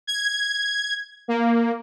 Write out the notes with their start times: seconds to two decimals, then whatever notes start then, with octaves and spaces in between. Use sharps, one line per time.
0.07 G#6
1.28 A#3